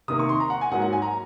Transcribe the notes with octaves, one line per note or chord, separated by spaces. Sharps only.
C3 D#3 A#3 D#6
C#6
C6
A#5
F#5
G#5
G#2 F#3 A#3 F#5
F#5
G#5
A#5